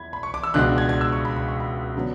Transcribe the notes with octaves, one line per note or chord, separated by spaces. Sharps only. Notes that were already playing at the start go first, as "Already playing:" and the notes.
Already playing: E2 B5 G#6
B5
C#6
D6
E6
C#2 B2 G#3 D4 F#6
G#6
G#6
E6
C#6
B5
B5
C#6
B5
D3 F#3 B3 D4